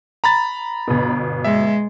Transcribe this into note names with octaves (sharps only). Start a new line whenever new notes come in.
A#5 B5 A6
G1 B2
G#3 E5